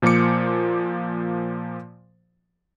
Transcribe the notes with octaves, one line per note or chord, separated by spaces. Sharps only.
A#2 F3 A#3 C5 D6 C#7